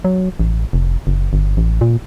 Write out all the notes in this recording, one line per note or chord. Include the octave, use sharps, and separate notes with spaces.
F#3
A1
F1
F#1
G1
A1
A#2